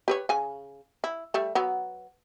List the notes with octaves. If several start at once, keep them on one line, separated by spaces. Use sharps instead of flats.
G4 B4 C#5
C#3 G#5
E4
G3 A3
F#3 B3